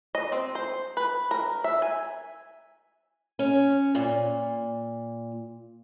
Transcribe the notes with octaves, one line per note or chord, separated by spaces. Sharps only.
D#5
C4
C5
B4
A#4
E5
G#5
C#4
A#2